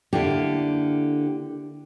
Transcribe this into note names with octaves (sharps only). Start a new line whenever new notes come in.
D3 A#3 E4 G4